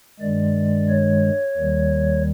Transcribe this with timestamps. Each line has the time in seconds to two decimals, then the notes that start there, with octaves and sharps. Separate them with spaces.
0.20 G2 D#3 G#3 D5
0.89 C#5
1.58 D#2 D#3 G3